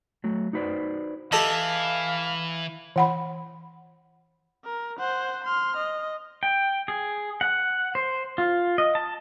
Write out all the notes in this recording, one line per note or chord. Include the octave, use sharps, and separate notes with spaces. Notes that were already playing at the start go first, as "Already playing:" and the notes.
F#3 A3
D#4 F#4 B4 C5 D5
E3 G4 A4 D#5 F5
E3 F#5 B5
A#4
C5 F#5
C6 F6
D#5
G5
G#4
F#5
C5
F4
D#5
A5